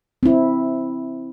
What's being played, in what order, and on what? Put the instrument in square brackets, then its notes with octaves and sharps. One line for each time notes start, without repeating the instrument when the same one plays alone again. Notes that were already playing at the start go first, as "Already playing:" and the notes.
[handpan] C4 E4